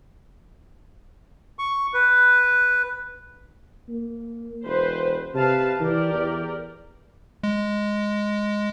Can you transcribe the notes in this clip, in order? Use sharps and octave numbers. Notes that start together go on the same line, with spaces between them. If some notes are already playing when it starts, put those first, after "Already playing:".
C#6
B4
A#3
E1 B4 C5
C3 B4 F5 A5
E3 G4 A#4 D5
E2
G#3